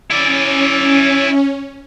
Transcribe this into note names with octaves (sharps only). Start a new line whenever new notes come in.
C#4 E4 D5